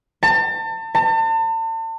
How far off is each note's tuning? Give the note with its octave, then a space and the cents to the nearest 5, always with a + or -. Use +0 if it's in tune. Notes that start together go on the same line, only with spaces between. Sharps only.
A5 +35
A5 +40